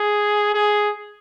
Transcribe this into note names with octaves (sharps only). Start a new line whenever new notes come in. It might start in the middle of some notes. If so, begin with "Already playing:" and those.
Already playing: G#4
G#4